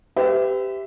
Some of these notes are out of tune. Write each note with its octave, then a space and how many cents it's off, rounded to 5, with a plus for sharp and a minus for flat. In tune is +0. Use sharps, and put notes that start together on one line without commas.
G4 +0 B4 +45 E5 +0